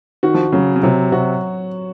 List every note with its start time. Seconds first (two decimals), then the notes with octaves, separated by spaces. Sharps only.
0.23 D#3 F#4
0.34 F3
0.43 D#3
0.52 C#3 F#3
0.76 C#3
0.83 C3 F#3
1.12 C3 F#4